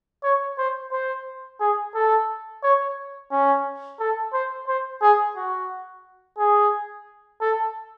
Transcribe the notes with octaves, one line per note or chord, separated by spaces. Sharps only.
C#5
C5
C5
G#4
A4
C#5
C#4
A4
C5
C5
G#4
F#4
G#4
A4